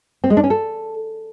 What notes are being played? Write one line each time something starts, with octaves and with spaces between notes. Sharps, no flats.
C4
G#3
D4
C#4
A4